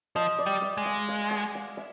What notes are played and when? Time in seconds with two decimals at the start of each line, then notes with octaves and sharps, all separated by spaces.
0.15 F3 D#5
0.39 D5
0.46 G3
0.62 E5
0.78 G#3
0.86 F5
1.09 F5
1.31 F#5
1.55 F5
1.77 E5